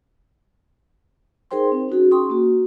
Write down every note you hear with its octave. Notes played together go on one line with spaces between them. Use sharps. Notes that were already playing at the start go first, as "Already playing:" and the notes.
D#4 G#4 A#4 C5 G5 C6
C4
C#4 D#4 F#4 G#4
C#4 G#4 G5 C6 C#6 D#6
A#3 F#4